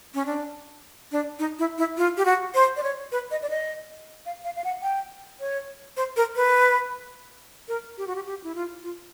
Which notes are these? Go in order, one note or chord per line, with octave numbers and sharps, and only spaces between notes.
C#4
D4
D4
D#4
E4
E4
F4
G4
F#4
C5
D5
C#5
B4
D#5
D5
D#5
F5
F5
F5
F#5
G5
C#5
C5
A#4
B4
A#4
G4
F#4
G4
G4
E4
F4
F4